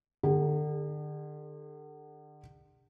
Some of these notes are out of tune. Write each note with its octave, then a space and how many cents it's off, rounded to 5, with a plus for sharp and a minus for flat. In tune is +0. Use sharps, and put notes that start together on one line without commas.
D3 +35 G#4 -45